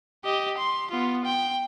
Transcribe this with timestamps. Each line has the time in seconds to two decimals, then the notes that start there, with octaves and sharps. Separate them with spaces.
0.24 G4 D#5
0.58 C6
0.91 B3 F4
1.25 G5